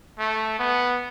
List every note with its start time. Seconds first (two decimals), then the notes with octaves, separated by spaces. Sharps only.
0.19 A3
0.59 B3